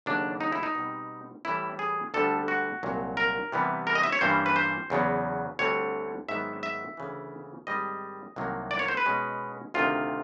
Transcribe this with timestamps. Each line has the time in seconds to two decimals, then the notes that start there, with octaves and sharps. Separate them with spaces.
0.06 D#2 C#3 F#3 A3 D4
0.41 D#4
0.52 E4
0.63 D#4
0.75 B2 G3 C4
1.45 A2 E3 G3 E4
1.79 G#4
2.14 D2 D3 G3 A4
2.48 F#4
2.83 C2 A#2 F#3
3.17 A#4
3.52 C3 E3 G3 B3
3.87 A#4
3.95 D#5
4.03 E5
4.12 C#5
4.21 G2 E3 G3 A#3 C#4 C5
4.46 B4
4.56 C5
4.90 E2 C#3 F#3 B3
5.59 D2 D3 G3 C4 C#5
6.28 G#2 D#3 F#3 B3 E5
6.63 E5
6.97 D2 C#3 E3
7.67 G#2 D#3 G3 C4 D#5
8.36 C2 C3 D#3 F#3 A#3
8.71 D5
8.79 C#5
8.88 C5
8.97 B4
9.05 B2 G#3 C#4
9.74 D2 C3 D#3 F4